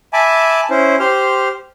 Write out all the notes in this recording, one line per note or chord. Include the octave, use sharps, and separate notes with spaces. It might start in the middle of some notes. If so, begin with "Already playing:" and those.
E5 G#5 A5 B5 D6
C#4 E4 C5
G4 C5 C6 F6